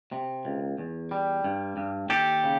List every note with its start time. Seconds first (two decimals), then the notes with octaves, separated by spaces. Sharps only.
0.12 C3
0.45 C#2
0.78 E2
1.11 G3
1.44 G2
1.77 G2
2.09 D#2 G4 A4
2.43 C#3